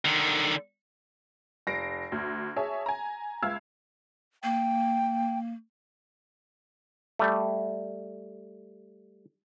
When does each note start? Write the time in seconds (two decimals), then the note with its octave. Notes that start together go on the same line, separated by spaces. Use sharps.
0.05 D3 D#3
1.67 F1 A#6 C7 D7
2.12 D2
2.56 G#4 C#5 E5 G#5 A5
2.86 G#5 A#5
3.42 C#2 E5 F5 E6 G#6
4.43 A#3 G5
7.19 G3 A3